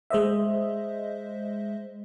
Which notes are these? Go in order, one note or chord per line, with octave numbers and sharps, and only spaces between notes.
G#3 C5 D#5 E5